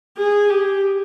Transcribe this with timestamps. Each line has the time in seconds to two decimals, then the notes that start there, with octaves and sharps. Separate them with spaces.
0.18 G#4
0.50 G4